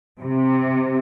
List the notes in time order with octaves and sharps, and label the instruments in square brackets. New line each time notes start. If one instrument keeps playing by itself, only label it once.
[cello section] C3